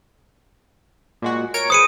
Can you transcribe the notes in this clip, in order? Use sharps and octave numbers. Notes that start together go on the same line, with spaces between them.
A#2 G#3 F#4
A#4 C#5 D7
G#4 B4 C5 D#6 C#7 D#7